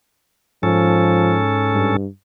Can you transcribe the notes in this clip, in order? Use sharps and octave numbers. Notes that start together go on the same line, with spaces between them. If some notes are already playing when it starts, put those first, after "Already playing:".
G#2 F3 C#4 A4
G2